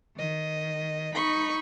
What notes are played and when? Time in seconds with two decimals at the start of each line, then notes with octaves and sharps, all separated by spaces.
0.15 D#3 D#5
1.15 D#4 B5 C#6